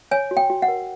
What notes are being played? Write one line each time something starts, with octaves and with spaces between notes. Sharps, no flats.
C#5 G#5
F#4
G5
F#4
F#5
A#4